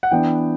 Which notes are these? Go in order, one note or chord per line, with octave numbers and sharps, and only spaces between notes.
F#5
E3 B3 D4 G5